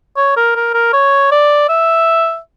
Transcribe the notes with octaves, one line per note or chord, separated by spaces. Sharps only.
C#5
A#4
A#4
A#4
C#5
D5
E5